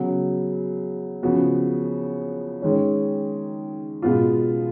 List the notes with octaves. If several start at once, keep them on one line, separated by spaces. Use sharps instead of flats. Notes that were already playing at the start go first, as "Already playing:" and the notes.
Already playing: C#3 F#3 B3
C#3 F3 B3 F#4
D#3 G#3 C#4
B2 G#3 B3 F4